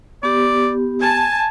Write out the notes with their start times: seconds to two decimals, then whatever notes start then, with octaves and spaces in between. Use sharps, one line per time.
0.23 B3 G4 D5
1.02 G#5 A5